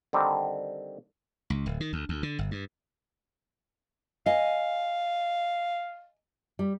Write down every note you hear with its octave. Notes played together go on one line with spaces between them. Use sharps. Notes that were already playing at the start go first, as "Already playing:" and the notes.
D3 D#3 G3 C4
C#2
D1
D#3
D2
D2
D3
G1
G2
D#5 F5 G#5
G3